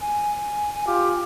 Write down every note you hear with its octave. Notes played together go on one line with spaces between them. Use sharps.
G#5
G#5
F4 G4